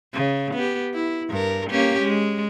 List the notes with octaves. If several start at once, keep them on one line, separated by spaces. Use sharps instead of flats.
C#3
B3 G4
E4
G2 A#4
A#3 C#4 G4
G#3